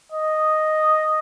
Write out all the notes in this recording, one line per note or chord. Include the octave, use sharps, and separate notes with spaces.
D#5